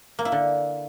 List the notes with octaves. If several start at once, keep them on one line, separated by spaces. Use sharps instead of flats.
A#3
E4
D3